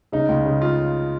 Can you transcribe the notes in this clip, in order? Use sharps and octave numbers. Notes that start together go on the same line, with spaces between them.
C#3 D#4
C#2
C#3
F4